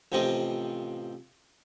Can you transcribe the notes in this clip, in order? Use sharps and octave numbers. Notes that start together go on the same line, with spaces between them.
A1 C3 F3 C4 D#5